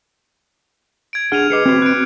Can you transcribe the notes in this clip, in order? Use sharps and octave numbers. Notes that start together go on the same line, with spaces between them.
G#6 D7
D4 G#4 F#5 F6 D#7 F7
G#4 B4 D#5 D6 C7 C#7
C4 F#4 B4
F#6 D7